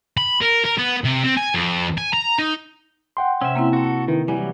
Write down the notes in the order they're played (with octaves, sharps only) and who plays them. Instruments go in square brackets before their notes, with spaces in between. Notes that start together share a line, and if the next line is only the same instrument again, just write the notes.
[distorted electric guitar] B5
A#4
A#4
B3
C3
C4
G#5
F2
G#5
A#5
D#4
[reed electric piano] F#5 G5 C6
[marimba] C3 [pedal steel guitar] C#4 E5
[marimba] A#3 C4 E4
[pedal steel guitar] F#4 A4
[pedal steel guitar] D#3 [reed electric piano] E4 B4
[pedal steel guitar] E3 F#3 G3 [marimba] G#5